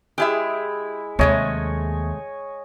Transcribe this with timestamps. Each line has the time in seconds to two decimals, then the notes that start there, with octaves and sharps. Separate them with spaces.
0.18 G#3 E4 G4 G#4 E5
1.19 D#2 C3 G#3 A3 C#5 D#5 G#5